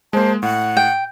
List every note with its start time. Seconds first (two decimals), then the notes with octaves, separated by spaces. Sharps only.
0.13 G#3 A#3 C5 A5
0.43 A2 F#5
0.77 G5